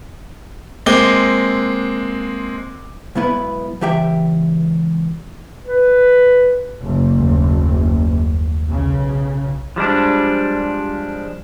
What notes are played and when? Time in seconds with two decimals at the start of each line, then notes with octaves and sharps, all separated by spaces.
0.86 G#3 A#3 C4 D6 G7
3.15 B1 G#2 B3 E4 B4
3.81 C#2 E3 G4 E5 G5
5.65 B4
6.84 F#1
7.19 D#2 A3
8.65 B1 C#3
9.76 F3 G3 G#3 D4